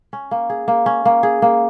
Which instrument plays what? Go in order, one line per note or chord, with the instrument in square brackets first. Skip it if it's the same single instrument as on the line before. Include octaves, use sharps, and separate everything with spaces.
[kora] C#4
A#3
G#4
A#3
C#4
A#3
G#4
A#3